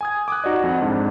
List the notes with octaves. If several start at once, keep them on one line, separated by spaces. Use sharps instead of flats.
G#5 D#6 G#6
D6 D#6 F#6
D#4 F#4 D5 D#5
F2 F#5
F2 G#2 D4